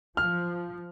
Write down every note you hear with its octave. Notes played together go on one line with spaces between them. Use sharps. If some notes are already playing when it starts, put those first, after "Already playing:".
F3 F6